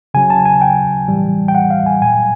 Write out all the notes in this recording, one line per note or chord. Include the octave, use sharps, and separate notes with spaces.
C#3 F#3 G#5
A5
G#5
G5
A2 E3 G3
G5
F#5
F5
G#5
A#2 F#3 G#5